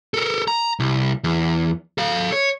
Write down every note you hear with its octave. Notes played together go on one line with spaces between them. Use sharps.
A4 A#4
A#5
C2
E2
A4 F5
C#5